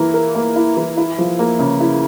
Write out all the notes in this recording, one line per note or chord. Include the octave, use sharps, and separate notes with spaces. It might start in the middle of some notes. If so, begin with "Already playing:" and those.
Already playing: E3 A#3 E4 A#4
A#4
A#3
E4
E3
E4
F3
A#3
C#3
E4